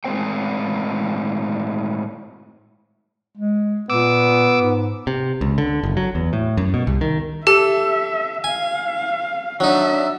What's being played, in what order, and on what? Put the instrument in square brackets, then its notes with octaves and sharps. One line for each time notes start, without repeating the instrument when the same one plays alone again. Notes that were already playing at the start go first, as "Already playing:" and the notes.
[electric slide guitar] A2 G#3 B3 C4 C5 G5
[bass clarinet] G#3
[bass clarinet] A#2 [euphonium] B3 [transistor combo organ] D6 E6
[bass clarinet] G#2
[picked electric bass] C3
C#2
D3
F#1
F#3
E2
A2
F#2
B2
C2
D#3
[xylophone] G4 [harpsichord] A4 [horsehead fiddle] E5
[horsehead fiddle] F5 [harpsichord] G#5
[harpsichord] F#3 D#4 [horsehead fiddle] D4 E5